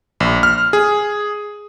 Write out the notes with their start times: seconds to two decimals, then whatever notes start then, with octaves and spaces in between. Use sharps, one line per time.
0.20 A#1
0.43 F6
0.73 G#4